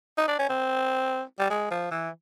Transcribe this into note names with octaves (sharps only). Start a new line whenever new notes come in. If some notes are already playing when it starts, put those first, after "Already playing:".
D#4
D4
C#4
C4
G3
G#3
F3
E3